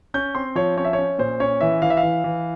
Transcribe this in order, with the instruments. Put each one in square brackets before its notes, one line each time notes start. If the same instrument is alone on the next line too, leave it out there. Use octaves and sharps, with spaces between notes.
[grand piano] C#4 G6
C4 C6
F3 C#5
C#4 C#5
E5
C#5
C#4
A#2 C5
C#4 C#5
E3 E5
E3 F5
E5
F5
E3
E3